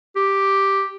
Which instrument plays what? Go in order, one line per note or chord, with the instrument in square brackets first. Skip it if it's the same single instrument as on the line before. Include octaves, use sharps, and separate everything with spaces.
[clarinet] G4